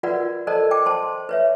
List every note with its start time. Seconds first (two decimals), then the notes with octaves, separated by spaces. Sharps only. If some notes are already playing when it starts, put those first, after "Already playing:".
0.03 F4 F#4 A#4 B4 D5 F#5
0.23 F4
0.47 A4 A#4 C5 D5 D#5 A5
0.71 G5 D6
0.86 C5 A5 C6
1.29 B4 C#5 E5